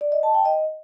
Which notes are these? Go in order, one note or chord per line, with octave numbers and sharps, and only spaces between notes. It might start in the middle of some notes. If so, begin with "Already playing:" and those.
D5
D#5
A5
G5
D#5